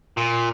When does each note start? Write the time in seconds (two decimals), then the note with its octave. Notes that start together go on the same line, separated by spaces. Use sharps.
0.17 A#2